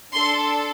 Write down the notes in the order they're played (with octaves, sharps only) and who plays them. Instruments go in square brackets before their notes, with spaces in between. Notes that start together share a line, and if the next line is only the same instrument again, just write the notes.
[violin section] D4 A4 C6